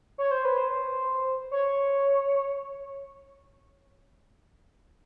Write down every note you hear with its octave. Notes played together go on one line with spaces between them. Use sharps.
C#5
C5
B4
C5
C#5